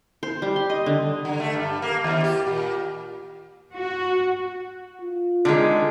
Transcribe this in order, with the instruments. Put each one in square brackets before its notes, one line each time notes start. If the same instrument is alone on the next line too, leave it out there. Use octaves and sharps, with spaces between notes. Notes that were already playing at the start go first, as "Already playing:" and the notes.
[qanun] C5
G3
C6
D#5
D3
[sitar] D3
A3
G2
A#3
D#2
G4
A#2
[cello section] F#4
[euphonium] F4
[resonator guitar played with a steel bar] D3 D#3 G#3